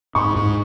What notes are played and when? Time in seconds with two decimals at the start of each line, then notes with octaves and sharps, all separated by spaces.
0.15 G#2 C#6
0.36 G#2